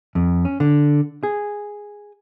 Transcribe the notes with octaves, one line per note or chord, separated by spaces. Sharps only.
F2
C#4
D3
G#4